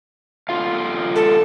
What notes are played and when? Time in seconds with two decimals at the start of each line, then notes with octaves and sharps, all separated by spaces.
0.49 D3 F4 F5
1.16 A4